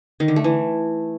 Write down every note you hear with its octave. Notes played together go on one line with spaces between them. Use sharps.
D#3
D3
A3
E3